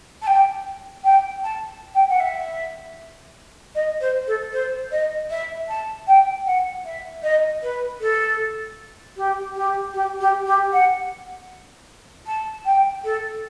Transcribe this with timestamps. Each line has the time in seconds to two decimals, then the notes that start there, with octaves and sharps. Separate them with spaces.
0.22 A5
0.27 G5
1.04 G5
1.44 A5
1.94 G5
2.09 F#5
2.20 E5
3.75 D#5
4.01 C5
4.27 A4
4.53 C5
4.91 D#5
5.30 E5
5.68 A5
6.07 G5
6.46 F#5
6.85 E5
7.23 D#5
7.63 B4
8.01 A4
9.17 G4
9.55 G4
9.94 G4
10.21 G4
10.46 G4
10.72 F#5
12.26 A5
12.65 G5
13.04 A4